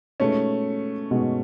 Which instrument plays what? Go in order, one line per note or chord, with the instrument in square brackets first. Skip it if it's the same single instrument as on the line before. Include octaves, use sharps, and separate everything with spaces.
[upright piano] B2 G#3 B3 D#4 [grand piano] A3 C#4
[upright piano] B2 G#3 B3 D#4